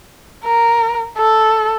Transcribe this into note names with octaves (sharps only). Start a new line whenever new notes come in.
A#4
A4